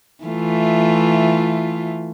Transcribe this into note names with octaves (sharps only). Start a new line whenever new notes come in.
E3 A3 F4